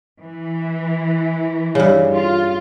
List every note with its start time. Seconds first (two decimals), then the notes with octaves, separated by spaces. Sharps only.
0.22 E3
1.75 G2 C#3
2.13 F4